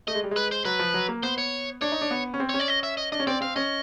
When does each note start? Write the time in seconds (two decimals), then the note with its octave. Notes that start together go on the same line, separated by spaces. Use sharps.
0.08 A3 D#5
0.15 G#3
0.24 G3
0.31 G#3 B4
0.51 C5
0.65 F#3 B4
0.79 F3
0.94 F#3
1.08 A#3
1.23 B3 C5
1.38 C#5
1.81 D4 C#5
1.92 D#4
2.01 D4
2.11 B3
2.34 C#4
2.40 C4
2.49 C#4 C#5
2.59 D5
2.68 D#5
2.83 E5
2.97 D#5
3.12 D4 D#5
3.20 C#4
3.27 C4 D5
3.41 C4 F5
3.56 C#4 D#5